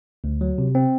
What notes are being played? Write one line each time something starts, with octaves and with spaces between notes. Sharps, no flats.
D2
F#3
C3
C4